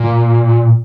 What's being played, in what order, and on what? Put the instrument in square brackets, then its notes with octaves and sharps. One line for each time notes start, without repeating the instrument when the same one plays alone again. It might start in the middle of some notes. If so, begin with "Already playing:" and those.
Already playing: [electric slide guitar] A#2